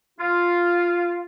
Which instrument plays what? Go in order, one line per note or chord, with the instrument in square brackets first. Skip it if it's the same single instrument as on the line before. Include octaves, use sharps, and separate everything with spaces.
[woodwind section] F4